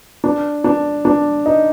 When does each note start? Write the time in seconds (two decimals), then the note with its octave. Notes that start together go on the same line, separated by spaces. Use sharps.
0.24 D4
0.64 D4
1.05 D4
1.46 D#4